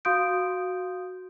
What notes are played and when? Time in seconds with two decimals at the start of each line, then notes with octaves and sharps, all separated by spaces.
0.05 F#4 F5 C6 D#6 G6 D7